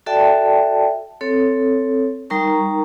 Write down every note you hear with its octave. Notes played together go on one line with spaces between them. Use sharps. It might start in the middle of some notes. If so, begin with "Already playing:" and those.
F#4 A4 D5 E5 G5 A5
C4 A4 C#5
G3 D#4 A#4 A#5 C#6